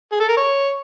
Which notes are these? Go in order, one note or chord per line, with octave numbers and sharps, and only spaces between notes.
G#4
A4
A#4
C#5